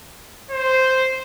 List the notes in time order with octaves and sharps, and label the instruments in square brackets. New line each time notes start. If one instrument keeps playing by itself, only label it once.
[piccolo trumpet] C5